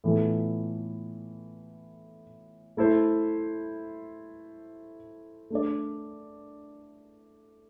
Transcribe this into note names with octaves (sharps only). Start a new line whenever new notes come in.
A2 E3 B3 F4 A4
A3 E4 A4 C5
A3 D4 A4 D5